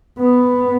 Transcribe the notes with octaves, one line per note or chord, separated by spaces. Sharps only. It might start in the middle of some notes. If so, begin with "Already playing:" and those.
B3